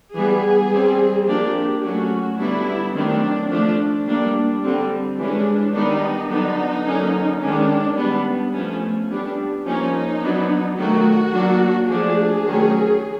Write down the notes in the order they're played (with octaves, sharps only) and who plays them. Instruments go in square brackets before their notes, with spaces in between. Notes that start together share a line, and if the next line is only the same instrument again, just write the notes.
[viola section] E3 G3 B3 G#4
G3 C4
F3 A#3 D4 G4
F#3 A3 C#4 F#4
D3 G3 B3 D4 E4
D#3 F#3 A3 C4 D4
F3 A3 D4
G3 A#3 D4
D3 G3 C4
E3 G#3 C#4 D4
D#3 G3 B3 D4 D#4
D3 F#3 B3 D4 D#4
D3 F#3 A#3 C#4
D#3 G#3 C#4 D4
G3 B3 D4
F3 A3 C#4
G3 B3 D4
F3 A#3 C#4 D#4
F#3 B3 D4
D#3 F#3 A3 F#4
F#3 A#3 D4
F3 A3 D4 G#4
D#3 F#3 A3 C#4